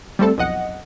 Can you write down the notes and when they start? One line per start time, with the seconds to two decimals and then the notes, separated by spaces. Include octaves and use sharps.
0.19 G3 A3 C4 A4
0.38 B1 F2 D#5 F#5